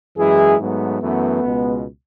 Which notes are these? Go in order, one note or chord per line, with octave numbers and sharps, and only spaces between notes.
F#2 E3 G#3 E4 G#4
G#2 F#3 A3 B3
F#2 E3 A3 B3
C#2 B2 G#3